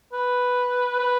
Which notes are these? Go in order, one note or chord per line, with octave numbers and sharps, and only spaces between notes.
B4
B4